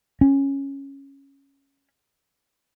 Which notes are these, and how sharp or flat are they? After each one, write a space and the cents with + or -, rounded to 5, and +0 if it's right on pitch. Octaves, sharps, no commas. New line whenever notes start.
C#4 -5